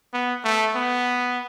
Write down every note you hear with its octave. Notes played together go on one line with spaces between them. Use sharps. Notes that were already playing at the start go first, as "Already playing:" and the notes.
B3
A3
B3